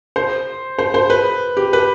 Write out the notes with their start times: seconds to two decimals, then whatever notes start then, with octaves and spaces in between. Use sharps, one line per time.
0.16 C5
0.79 C5
0.94 C5
1.10 B4
1.57 G4
1.73 B4